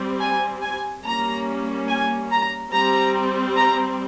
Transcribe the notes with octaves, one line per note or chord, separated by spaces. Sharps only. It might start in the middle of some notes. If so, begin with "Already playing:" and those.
Already playing: G3 C4
G#5
G#5
G3 A#3 C#4 A#5
G#5
A#5
G3 C4 A#5
A#5